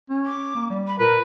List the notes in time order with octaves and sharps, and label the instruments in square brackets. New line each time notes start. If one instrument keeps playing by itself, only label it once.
[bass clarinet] C#4
[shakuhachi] D6
[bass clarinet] A#3
G3
[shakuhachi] B5
[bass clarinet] A#2 [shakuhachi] A#4 [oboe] B4